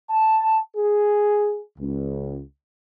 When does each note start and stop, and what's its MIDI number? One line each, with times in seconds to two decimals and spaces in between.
0.10 0.59 81
0.77 1.60 68
1.79 2.41 37